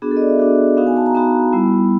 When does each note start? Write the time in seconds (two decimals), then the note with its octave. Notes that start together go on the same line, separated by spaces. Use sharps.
0.02 B3 D4 F#4 G#4
0.11 A4
0.17 D#5
0.21 D5
0.30 E5
0.39 B3 D4 F#4
0.77 B3 D#4 F#4 F5
0.87 G#5
0.97 A5
1.06 A#5
1.15 B3 D#4 F#4 B5
1.53 G3 B3 E4